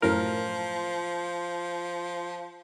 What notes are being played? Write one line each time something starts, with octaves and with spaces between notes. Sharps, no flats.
F#2 A2 F3 A#4